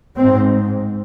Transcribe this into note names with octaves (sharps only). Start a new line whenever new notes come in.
G#2 C4